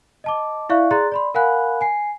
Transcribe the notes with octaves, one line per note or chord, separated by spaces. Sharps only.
D#5 A5 D6
E4 D5 E5 F5 C#6 F#6
G#4 D5 A#5 C6 F#6 A6
D5 B5 C6
A#4 F5 F#5 G#5 B5 F#6
G#5 C7